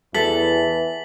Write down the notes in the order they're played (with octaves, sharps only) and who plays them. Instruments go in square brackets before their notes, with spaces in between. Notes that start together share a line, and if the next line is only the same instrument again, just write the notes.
[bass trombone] E2 [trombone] E3 [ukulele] A4 [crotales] B6 F#7